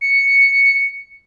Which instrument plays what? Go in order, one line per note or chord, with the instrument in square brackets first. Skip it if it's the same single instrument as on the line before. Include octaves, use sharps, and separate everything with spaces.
[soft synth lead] C#7